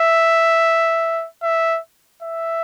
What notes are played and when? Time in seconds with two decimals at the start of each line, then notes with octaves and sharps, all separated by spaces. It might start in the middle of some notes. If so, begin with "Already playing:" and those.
Already playing: E5
1.43 E5
2.22 E5